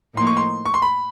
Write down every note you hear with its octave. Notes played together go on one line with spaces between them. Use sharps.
A2 F3 A#3 D#4 C6
C#6
C6
C#6
C6
B5